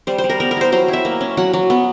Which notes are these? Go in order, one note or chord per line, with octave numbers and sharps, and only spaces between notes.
G3 C5
C5
G3
A#4
B3 A#4
A#4
E4 C5
F#3 C5
E4
E5
A#3
C#4
F#3 F#5
F#3
B3